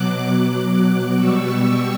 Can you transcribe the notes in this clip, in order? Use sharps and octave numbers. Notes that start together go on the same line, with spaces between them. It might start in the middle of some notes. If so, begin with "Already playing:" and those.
Already playing: B2 F#3 D6 F#6
D6 F#6
B2 G3 C#6 E6